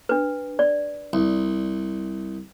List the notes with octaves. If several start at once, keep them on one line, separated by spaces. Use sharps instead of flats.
D4 B4
D5
C2